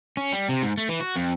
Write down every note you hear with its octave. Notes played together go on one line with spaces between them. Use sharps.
C#4
G3
C3
G#2
A3
E3
F#4
F2